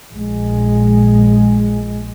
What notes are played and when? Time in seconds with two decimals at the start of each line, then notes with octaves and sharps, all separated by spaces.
0.12 A#1 G#3